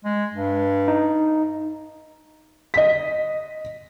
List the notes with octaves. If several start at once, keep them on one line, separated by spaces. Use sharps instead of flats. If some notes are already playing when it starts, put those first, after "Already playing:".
G#3
G2
D#4
D#5 B6